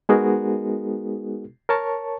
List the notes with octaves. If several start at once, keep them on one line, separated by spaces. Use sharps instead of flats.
G#3 B3 D#4 F#4 G#4 A#4
A#4 C#5 A5 C#6